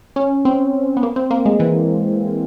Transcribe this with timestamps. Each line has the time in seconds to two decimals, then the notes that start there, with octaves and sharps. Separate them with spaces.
0.16 C#4
0.45 C4
0.97 B3
1.03 A#3
1.16 C4
1.31 A#3
1.46 G#3
1.60 E3